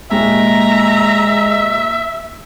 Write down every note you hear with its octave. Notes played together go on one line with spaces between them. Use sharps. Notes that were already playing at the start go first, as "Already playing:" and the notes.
D#2 A#2 G#3 E5 A#5